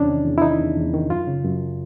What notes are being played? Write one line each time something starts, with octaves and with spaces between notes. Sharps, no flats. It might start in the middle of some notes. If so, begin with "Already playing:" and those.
Already playing: E2 C3 C#4 D4
D#3
E2
E4
D#3 D#4
E2
E2
D#3
F#2 F4
C#3
F#2